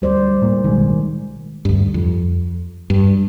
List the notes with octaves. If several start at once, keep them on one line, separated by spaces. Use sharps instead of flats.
D2 G3 C5 D5
A2 A#3
B1 B2 D#3 G#3
D2 G2
F2
G2